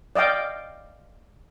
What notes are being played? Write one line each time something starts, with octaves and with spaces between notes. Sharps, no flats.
D5 D#5 F5 G5